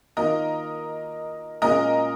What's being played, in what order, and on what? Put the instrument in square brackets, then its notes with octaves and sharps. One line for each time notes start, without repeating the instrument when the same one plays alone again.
[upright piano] D#3 A#3 F4 [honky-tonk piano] A#4 D#5
[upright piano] A#2 G#3 C#4 F4 [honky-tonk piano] A#4 D#5